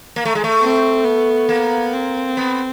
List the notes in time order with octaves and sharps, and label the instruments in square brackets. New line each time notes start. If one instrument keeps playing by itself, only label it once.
[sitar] A#3
A3
G#3
A3
[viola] C4
B3
[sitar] A#3
[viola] C4
[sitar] B3